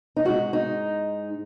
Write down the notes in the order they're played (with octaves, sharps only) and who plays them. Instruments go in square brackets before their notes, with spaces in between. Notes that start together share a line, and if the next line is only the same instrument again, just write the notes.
[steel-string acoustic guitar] D#4
G#2 G#3 F#4
D#4